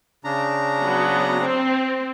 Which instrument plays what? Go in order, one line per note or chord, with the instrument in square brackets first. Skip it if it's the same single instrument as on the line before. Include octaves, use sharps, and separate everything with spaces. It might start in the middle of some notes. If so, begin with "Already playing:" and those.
[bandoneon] C#3 D4 A#5
[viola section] F#3 B3
C4